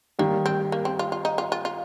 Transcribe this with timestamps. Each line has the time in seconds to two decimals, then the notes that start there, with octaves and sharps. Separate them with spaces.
0.19 D#3 G3 A#3
0.46 C4
0.72 A#3
0.85 C4
0.99 F4
1.12 F4
1.25 D#4
1.38 F4
1.52 F4
1.65 F4